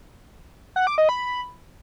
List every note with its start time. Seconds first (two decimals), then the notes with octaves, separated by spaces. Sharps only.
0.76 F#5
0.87 D6
0.98 D#5
1.09 B5